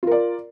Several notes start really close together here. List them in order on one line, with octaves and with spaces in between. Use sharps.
F4 A#4 D5